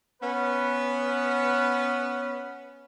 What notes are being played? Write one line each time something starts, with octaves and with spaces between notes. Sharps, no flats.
B3 C#4 B4